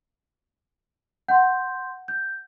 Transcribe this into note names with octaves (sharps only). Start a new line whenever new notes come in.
F#5 C6 G6
G6